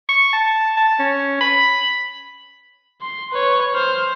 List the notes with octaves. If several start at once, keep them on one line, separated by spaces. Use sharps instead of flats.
C#6
A5
A5
C#4
B5
C6
B4 C#5
C5 F6